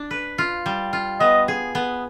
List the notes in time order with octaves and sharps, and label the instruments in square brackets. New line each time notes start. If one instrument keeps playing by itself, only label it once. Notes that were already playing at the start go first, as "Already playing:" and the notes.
Already playing: [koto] D4
B4
F4
G3
F4
[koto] B3 [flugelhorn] D#5
[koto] G#4
B3